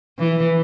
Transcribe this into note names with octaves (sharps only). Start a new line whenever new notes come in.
E3